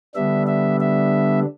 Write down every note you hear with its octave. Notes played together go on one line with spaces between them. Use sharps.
D3 G3 B3 D4 E5
E5
E5